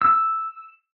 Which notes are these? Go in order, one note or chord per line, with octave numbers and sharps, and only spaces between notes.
E6